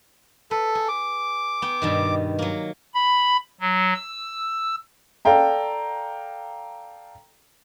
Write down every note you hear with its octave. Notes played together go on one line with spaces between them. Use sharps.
A4 B4
G#4
D6
B3 G5
G2 B2 D#3
F#3 A#3
B5
F#3
E6
A4 D5 F5 G5 A#5